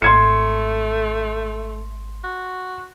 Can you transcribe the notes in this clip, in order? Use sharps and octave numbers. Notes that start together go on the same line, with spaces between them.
G#1 A3 C6 G#6 C#7
F#4